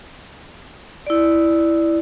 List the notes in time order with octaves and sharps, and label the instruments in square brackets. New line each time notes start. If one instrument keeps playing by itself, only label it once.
[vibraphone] E4 D5